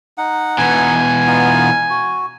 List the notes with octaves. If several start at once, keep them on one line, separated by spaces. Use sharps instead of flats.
D#4 F#5
B2 E3 G#5
B3 D#4 F4
F#4